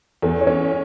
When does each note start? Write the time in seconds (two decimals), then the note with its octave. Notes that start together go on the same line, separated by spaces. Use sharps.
0.22 E2 A4
0.41 C#5
0.47 C#4